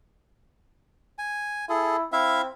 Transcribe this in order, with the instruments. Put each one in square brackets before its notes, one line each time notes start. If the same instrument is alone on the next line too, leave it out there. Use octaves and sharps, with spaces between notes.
[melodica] G#5
[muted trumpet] E4 [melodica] G#4 A4
[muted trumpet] C4 [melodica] E4 E5 F5